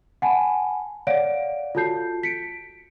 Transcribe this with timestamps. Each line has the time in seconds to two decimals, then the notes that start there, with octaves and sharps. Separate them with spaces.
0.22 F#5 G#5 A5 B5
1.07 C#5 D5 F5 F#5 D7
1.75 F4 F#4 A4 A5 G6 C7
2.23 B6 C#7 D7